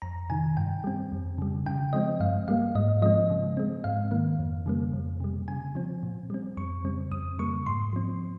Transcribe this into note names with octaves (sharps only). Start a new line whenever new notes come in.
F2 A#5
C3 D#3 G#5
G2 G5
G3 C4
F2
C#3 G3
C#3 G5
F3 G#3 C4 D#5
G2 F5
G3 A#3 F5
G#2 D#5
F3 G#3 C4 D#5
C#3
G#3 C4
G#2 F5
D#3 A#3
F2
C#3 G3 A#3
F2
C3 G3
C#3 G#5
F3 C4
A#2
G3 C4
F2 C#6
C#3 G3 C4
F2 D#6
C#3 G3 A#3 C#6
G#2 C6
F3 C4